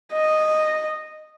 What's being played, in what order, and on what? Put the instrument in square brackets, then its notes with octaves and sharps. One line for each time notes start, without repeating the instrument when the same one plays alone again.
[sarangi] D#5